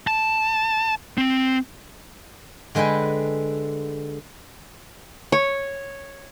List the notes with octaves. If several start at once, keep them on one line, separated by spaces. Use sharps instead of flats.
A5
C4
D3 G#3 B4 G5 G#5
C#5